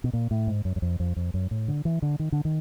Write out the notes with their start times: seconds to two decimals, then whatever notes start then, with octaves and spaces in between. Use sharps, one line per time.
0.04 B2
0.13 A#2
0.31 A2
0.47 G#2
0.65 F#2
0.76 F#2
0.82 F2
1.00 F2
1.16 F2
1.34 F#2
1.51 A2
1.68 D3
1.85 E3
2.02 D3
2.19 D#3
2.32 D3
2.45 D#3